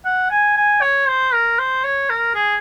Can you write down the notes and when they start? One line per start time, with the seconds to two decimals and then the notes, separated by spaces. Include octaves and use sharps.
0.05 F#5
0.30 G#5
0.56 G#5
0.81 C#5
1.08 C5
1.33 A#4
1.59 C5
1.84 C#5
2.10 A#4
2.35 G#4